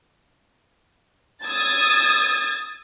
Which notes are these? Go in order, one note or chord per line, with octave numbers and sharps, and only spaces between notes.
D#6 E6 G#6 A6